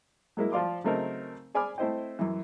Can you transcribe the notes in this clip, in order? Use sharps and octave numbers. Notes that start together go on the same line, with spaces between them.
F#3 G#3 A#3 E4
F3 F4 D5 F5 C6 D6
C#3 F#3 A3 C4 D#4 A#4
G#4 D5 G#5 B5 D6 F6
A3 C4 E4 C5 D#5 G5
F#2 E3